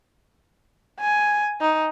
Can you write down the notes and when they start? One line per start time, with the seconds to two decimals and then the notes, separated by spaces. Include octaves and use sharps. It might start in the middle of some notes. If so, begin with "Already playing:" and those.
1.00 G#5
1.61 D#4